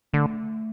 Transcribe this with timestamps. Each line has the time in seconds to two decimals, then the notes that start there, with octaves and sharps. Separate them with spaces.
0.13 D3 A3